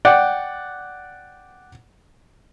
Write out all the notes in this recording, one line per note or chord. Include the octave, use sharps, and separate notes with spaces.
D5 F#5 G5